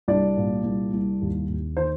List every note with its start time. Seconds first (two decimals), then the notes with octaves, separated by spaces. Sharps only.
0.08 C2 D4 D5
0.37 A#2
0.64 C2
0.93 C2
1.21 D#2
1.48 D#2
1.77 D#3 C5